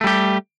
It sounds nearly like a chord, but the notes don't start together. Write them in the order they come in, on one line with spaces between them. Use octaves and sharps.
A3 G3 G4